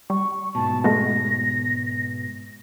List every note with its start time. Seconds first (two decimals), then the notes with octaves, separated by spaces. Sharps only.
0.10 G3 C#6
0.55 G#2 B2 A5
0.84 G#3 A3 B3 A#6